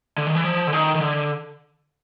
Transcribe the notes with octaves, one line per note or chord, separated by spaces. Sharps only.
D3
D#3
E3
F3
D3
D#3
D#3
D3